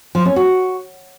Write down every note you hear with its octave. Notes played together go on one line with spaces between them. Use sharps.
F3
C#4
F#4